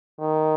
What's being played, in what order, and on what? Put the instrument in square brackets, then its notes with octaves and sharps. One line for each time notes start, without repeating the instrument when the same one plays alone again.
[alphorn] D#3